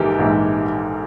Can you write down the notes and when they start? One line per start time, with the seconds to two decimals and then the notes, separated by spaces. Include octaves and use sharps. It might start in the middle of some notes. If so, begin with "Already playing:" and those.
Already playing: A#1 G#2 E3 G4 A4 A#4
0.18 A#1 G#2 E3